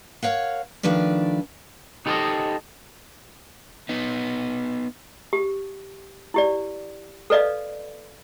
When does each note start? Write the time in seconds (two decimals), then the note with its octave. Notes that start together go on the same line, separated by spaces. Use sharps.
0.23 A#4 C#5 F5 F#5
0.83 D#3 F3 A3 D4 B4 D5
2.06 D#4 G4 A4 B4 C5 D#5
3.89 B3 D#4
5.33 G4
6.34 E4 G4 D5
7.30 A4 B4 D5 D#5 F5